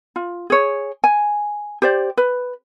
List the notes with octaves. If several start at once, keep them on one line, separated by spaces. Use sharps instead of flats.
F4
G#4 C#5
G#5
G4 C5 D5
B4